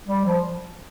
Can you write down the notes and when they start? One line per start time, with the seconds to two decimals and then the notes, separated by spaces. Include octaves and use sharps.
0.08 G3
0.26 F3